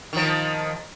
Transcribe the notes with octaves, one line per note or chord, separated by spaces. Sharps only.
D#3 F3